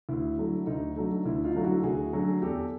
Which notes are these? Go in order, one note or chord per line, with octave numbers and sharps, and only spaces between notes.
D2 E4
D3 F#3 A3
D2 D#4
D3 F#3 A3
D2 E4
D#4 F4
D3 F#3 A3
E4 F#4
D2 F#4 G#4
D3 F#3 A3
E2 G4 A4